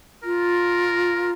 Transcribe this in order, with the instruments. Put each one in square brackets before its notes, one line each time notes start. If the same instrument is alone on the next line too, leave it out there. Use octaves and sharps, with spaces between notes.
[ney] F4 [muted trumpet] A#4